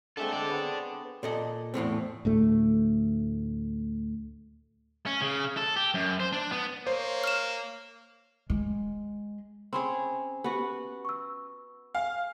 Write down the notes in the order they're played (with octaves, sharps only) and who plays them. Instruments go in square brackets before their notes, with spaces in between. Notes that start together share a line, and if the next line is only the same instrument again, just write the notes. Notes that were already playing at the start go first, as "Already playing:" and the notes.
[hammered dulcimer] D3 G#3 C4 [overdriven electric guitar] A4 E5
[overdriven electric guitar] A4 D5 [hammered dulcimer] G5
[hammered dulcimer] B3 C#5
[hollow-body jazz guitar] A#2 A4 D#5
E2 A2 A3 C4
[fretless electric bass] D2 A2 A3
[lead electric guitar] C#4
C#3
A4
G4
F#2
C5
D4
B3
[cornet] A#3 [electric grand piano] C5 [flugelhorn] C#5
[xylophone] F6 E7
[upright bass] G#3
[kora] C4 C#4 G#4 [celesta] B5 C6
[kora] B3 F#4 [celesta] G4
[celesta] C#6 E6
[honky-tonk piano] F5 [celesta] G#5